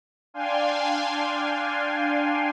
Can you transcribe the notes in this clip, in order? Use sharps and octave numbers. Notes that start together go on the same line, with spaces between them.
D4 F5 G5 G#5 C6